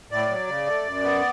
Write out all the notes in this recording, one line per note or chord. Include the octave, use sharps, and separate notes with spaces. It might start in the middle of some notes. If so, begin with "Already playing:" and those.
A2 D5
F#3
C#3
A3
F#2
B3